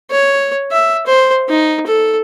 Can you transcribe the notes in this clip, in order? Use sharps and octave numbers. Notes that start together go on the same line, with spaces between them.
C#5
E5
C5
D#4
A4